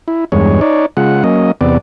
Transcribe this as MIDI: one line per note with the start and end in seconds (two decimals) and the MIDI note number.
0.08 0.25 64
0.32 0.61 40
0.32 0.61 43
0.32 0.61 56
0.32 0.61 73
0.61 0.86 63
0.61 0.86 73
0.61 0.86 74
0.97 1.23 49
0.97 1.23 56
0.97 1.23 65
0.97 1.23 78
1.24 1.51 54
1.24 1.51 58
1.24 1.51 61
1.24 1.51 75
1.61 1.78 40
1.61 1.78 48
1.61 1.78 59
1.61 1.78 74